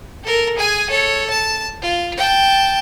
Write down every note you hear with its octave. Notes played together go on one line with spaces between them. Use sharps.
A4 A#4
G#4 G#5
A4 C#5
A5
F4
G5 A5